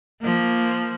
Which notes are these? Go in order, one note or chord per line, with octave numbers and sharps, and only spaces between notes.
F3 A#3